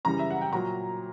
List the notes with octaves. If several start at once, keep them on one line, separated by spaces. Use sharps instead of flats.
F#2 C#3 E3 G3 A#5
E5
F#5
G5
A#2 F#3 A#5